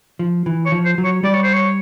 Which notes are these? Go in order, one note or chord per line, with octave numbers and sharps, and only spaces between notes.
F3
E3
C#5
F3
C5
F#3
C#5
G3 D5
C#5
C5
C#5